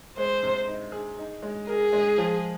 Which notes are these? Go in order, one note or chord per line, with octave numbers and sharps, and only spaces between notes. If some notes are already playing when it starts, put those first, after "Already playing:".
G#3 C5
C3
D#4
G#4
D#4
G#3
G#4 A#4
G#3
F3